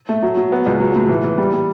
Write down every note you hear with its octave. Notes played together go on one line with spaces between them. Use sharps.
A3
F#3
F#3
B3
C#2
F#3
A2
E3
E3
G3
G3